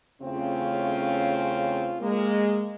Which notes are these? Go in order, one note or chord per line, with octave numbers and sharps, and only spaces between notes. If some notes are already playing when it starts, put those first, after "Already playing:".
E2 C#3 A3 C4 C#4 F4
G#3 A#3